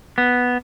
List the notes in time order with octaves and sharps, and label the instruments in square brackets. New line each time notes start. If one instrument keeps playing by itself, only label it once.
[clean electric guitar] B3